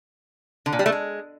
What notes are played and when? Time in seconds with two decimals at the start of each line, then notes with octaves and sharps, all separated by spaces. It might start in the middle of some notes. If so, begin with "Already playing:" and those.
0.66 D3
0.73 A#2
0.79 G3
0.86 A3
0.92 G#3